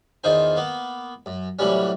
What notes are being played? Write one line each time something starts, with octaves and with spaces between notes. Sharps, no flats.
E2 D#3 D#4 F4 C5 G#5
A#3 B3
F#2
C2 A2 E3 F#3 G3 C#4